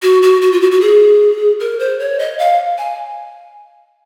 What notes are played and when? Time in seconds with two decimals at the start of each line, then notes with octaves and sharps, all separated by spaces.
0.02 F#4
0.23 F#4
0.42 F#4
0.52 F4
0.61 F#4
0.72 F#4
0.81 G#4
1.60 A#4
1.79 C5
2.00 C#5
2.19 D#5
2.39 F5
2.78 G#5